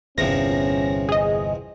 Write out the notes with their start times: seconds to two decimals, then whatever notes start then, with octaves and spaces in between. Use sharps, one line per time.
0.18 D1 G1 E2 C3 F3 C#4 A#6
1.09 G#4 D#5